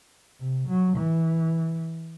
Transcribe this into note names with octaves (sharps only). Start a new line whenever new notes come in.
C3
F#3
E3